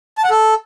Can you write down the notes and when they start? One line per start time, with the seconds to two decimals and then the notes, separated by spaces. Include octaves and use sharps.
0.18 A5
0.24 F#5
0.30 A4